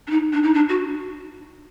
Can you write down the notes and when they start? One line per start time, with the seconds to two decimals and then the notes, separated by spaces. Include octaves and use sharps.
0.07 D4
0.11 D#4
0.33 D4
0.43 D#4
0.54 D4
0.69 F#4